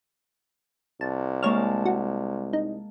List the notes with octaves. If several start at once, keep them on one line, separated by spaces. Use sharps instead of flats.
C2 A5
G#3 A#3 C#5 A5 F6
F#4
D#4